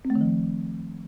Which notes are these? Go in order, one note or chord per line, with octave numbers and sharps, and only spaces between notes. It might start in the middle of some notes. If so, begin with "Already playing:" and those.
C4
A3
D#3
F3